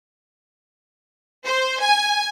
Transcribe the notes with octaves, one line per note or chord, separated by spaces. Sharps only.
C5
G#5